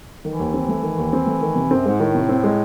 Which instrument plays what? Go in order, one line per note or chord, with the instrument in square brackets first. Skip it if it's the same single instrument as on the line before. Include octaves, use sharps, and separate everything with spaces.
[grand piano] D#3 [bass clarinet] E3
[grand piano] D#2
C4
A3
D#3
D#2
C4
A3
D#3
C3
[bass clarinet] F#2 [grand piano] C4
[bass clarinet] G#2 [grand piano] G#3
[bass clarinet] A2 [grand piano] D#3
[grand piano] C3
C4
G#3